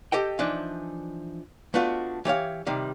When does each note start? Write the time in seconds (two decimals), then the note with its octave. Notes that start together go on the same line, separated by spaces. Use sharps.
0.12 G4 A4 D#5 G5
0.39 E3 F3 D4 D#4
1.74 A3 B3 D4 F4 F#4
2.25 E3 G4 C#5 F5
2.66 C3 D#3 G3